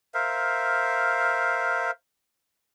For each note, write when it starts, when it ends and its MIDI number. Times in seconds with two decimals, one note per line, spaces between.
0.14 1.91 70
0.14 1.91 72
0.14 1.91 76
0.14 1.91 77